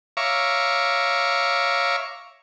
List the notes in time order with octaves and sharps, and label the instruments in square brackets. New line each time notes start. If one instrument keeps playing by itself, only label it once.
[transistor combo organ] C#5 E5 F5 A#5 C#6 D6